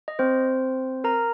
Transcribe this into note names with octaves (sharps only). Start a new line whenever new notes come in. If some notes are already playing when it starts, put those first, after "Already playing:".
D#5
C4 C5
A#4 A#5